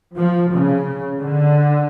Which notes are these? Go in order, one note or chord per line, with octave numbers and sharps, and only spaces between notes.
F3
C#3
D3